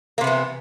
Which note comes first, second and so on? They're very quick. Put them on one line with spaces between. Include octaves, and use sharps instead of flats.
A#3 C3 B3 E3